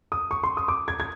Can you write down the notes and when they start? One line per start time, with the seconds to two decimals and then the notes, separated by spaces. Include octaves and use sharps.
0.12 D#6
0.31 C#6
0.43 C6
0.57 D#6
0.68 D6
0.88 G#6
1.00 G#6